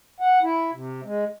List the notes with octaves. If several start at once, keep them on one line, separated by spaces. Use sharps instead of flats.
F#5
E4
C3
G#3